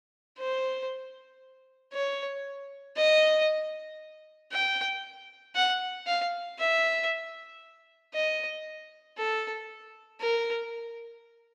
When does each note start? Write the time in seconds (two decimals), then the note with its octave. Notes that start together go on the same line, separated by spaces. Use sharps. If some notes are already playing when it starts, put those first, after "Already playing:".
0.38 C5
1.93 C#5
2.97 D#5
4.52 G5
5.55 F#5
6.07 F5
6.59 E5
8.14 D#5
9.17 A4
10.21 A#4